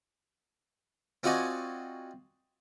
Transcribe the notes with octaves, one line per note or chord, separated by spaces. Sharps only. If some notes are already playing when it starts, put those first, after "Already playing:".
C4 F4 F#4 D5 D#5 G#5